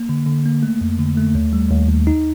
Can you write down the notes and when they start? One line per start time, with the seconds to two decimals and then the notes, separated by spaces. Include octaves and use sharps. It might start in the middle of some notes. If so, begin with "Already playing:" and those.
Already playing: A#3
0.09 D3
0.27 D3
0.46 A#3
0.63 A3
0.81 F2
0.99 D3
1.17 A3
1.35 D#2
1.53 G3
1.71 D#2
1.89 D#2
2.07 D#4